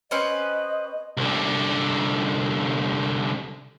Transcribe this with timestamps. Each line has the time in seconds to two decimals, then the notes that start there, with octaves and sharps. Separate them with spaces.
0.11 C4 C#4 B4 D#5
1.17 C2 D3